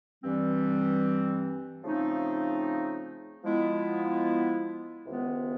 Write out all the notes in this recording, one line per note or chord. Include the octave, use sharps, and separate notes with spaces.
G2 E3 G3 C4
C#3 F3 A3 C4 D#4
F3 G#3 B3 E4
C#2 C3 D#3 G#3 B3